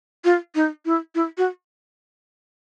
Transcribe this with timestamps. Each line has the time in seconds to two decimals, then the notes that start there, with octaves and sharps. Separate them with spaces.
0.24 F4
0.55 D#4
0.85 E4
1.15 E4
1.38 F#4